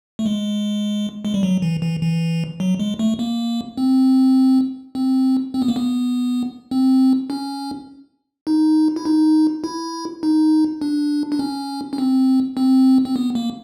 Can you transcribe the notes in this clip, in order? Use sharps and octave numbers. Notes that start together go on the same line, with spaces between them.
A3
G#3
G#3
G3
F#3
E3
E3
E3
F#3
G#3
A3
A#3
C4
C4
C4
B3
A#3
B3
C4
C#4
D#4
E4
D#4
E4
D#4
D4
D4
C#4
C#4
C4
C4
C4
B3
A#3